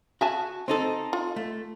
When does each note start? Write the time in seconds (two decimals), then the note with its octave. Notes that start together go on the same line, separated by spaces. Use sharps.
0.21 F#4 E5 G#5 A5
0.68 C4 D#4 A4
1.13 F4
1.36 A3